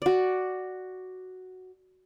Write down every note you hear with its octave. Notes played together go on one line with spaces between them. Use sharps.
F#4 D5